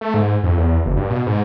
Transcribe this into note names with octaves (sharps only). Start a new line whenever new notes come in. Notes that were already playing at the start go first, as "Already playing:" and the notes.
A3
G#2
F2
E2
F#1
G2
B2
G#2